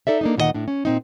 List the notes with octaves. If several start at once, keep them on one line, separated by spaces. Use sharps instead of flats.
D#4 A4 D5 E5
A#3 D4 D#4
D2 A#2 D#3 D#4 D#5 F#5
A2 D4
C#4
A#2 C4 D#4